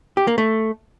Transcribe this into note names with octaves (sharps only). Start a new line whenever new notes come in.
G4
A#3
A3